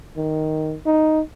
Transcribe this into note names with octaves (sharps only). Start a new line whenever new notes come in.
D#3
D#4